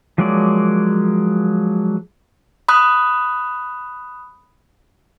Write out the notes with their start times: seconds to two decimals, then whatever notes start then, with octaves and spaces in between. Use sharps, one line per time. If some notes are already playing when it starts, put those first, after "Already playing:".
0.18 F3 F#3 G#3 A#3 D5
2.69 B5 D#6 F#6